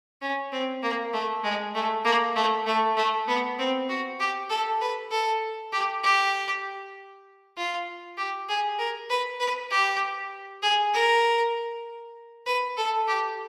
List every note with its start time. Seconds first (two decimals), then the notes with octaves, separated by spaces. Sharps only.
0.22 C#4
0.52 C4
0.83 A#3
1.13 A3
1.44 G#3
1.75 A3
2.04 A#3
2.36 A3
2.66 A3
2.97 A3
3.28 B3
3.59 C4
3.89 F#4
4.19 G4
4.50 A4
4.81 B4
5.11 A4
5.72 G4
6.03 G4
7.57 F4
8.17 G4
8.49 G#4
8.79 A#4
9.10 B4
9.40 B4
9.70 G4
10.62 G#4
10.93 A#4
12.46 B4
12.77 A4
13.08 G4